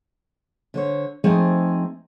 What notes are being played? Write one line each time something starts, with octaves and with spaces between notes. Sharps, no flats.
D3 C5 C#5
F3 A3 C4 D#4 G#4